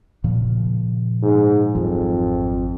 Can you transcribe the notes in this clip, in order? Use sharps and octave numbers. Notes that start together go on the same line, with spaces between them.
A#2 C#3 F3
G#2
G#1 F2 F#3